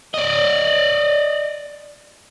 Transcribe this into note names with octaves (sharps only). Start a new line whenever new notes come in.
D5 D#5